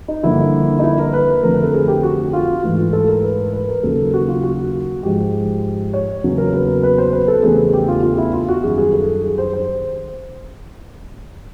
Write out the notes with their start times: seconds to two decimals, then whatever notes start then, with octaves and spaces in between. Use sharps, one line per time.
0.08 D#4
0.23 G2 D3 F3 A#3 E4
0.79 D#4
0.84 E4
0.99 A#4
1.13 B4
1.43 F2 D3 F3 A3 A#4
1.54 A#4
1.63 A4
1.74 G#4
1.88 G4
2.03 F#4
2.33 F4
2.63 G#2 E3 A3 F4
2.93 A4
3.08 A#4
3.23 B4
3.53 B4
3.68 A#4
3.83 D#2 C#3 F#3 A#3 A4
4.14 F#4
4.28 F4
4.43 F#4
5.03 G#2 F3 G#3 G4
5.93 C#5
6.24 E2 C#3 F#3 A#3
6.38 A#4
6.53 B4
6.83 B4
6.98 C5
7.13 B4
7.28 A4
7.43 E2 C#3 E3 A3 G#4
7.73 G4
7.88 F4
8.03 F4
8.18 E4
8.33 F4
8.49 F#4
8.63 F#2 D#3 G3 G#4
8.78 G#4
8.93 A4
9.23 G#4
9.38 C5
9.53 C5